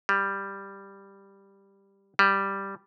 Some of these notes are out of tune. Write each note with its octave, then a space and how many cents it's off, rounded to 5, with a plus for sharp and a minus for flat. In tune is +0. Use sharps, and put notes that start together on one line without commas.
G3 +5
G3 +0